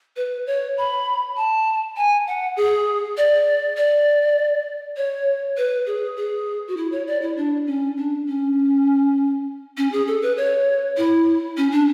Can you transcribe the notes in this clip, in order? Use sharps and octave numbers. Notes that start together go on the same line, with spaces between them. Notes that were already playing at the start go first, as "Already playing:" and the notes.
B4
C#5
B5
A5
G#5
F#5
G#4
D5
D5
C#5
B4
G#4
G#4
F#4
E4
C#5
D5
E4
D4
C#4
D4
C#4
C#4
G#4
A4
B4
C#5
E4
C#4
D4